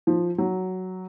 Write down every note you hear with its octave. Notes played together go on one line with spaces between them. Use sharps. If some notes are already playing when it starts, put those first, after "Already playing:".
F3
F#3